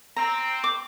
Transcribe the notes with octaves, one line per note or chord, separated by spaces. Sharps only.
C4 A#5
D6